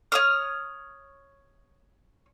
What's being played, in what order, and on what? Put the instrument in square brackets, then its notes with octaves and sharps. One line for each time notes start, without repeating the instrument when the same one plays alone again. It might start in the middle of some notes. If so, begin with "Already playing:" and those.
[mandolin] C#5 D#6 F6